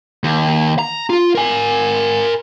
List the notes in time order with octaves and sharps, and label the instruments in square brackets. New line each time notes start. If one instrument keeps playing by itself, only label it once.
[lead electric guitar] D#2
A#5
F4
A#4 G#5